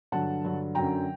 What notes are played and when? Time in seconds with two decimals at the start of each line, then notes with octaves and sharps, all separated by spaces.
0.12 G2 D3 F#3 F#5 A5
0.44 G2 D3 F#3
0.75 F#2 D3 F#3 G5 A#5